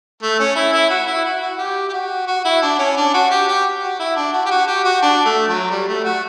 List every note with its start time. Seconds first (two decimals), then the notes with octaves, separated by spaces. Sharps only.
0.22 A3
0.39 C#4
0.56 E4
0.73 E4
0.90 F#4
1.07 E4
1.24 F#4
1.41 F#4
1.58 G4
1.89 G4
1.93 F#4
2.27 F#4
2.45 E4
2.62 D4
2.79 C#4
2.97 D4
3.14 F#4
3.30 G4
3.48 G4
3.82 F#4
3.99 E4
4.16 D4
4.33 F#4
4.45 G4
4.51 F#4
4.67 G4
4.84 F#4
5.02 D4
5.25 A3
5.48 F#3
5.70 G3
5.88 A3
6.04 F#4